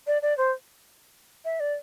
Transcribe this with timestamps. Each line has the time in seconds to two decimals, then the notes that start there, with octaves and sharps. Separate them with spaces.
0.07 D5
0.22 D5
0.38 C5
1.45 E5
1.60 D5